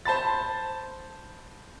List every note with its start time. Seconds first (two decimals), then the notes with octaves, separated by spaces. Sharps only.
0.05 C5 A5 B5 A6